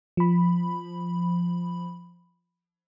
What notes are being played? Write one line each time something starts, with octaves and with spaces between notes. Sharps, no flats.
F3 B5